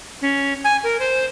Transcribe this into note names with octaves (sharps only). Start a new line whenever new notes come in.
C#4
G#5
A#4
C5